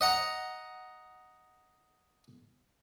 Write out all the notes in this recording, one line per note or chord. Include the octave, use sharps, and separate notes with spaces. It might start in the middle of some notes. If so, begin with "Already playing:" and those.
D#5 F#5 A#5